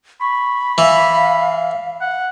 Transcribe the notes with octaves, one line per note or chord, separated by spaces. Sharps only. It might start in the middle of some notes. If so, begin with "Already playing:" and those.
B5 C#6
E3 F5
F#5